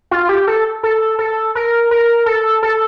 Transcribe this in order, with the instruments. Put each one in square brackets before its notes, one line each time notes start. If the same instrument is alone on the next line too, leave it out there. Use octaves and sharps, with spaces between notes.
[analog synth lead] F4
G4
A4
A4
A4
A#4
A#4
A4
A4